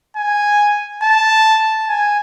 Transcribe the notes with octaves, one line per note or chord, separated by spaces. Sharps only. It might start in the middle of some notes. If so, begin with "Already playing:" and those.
G#5
A5
G#5